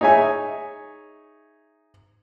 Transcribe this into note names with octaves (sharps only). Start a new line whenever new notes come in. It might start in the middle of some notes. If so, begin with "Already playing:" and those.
D#4 G#4 C#5 E5 G#5